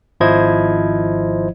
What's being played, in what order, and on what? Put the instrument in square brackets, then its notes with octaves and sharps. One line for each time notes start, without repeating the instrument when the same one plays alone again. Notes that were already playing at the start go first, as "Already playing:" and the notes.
[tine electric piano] G#1 F3 E4 C5 D#5 G#6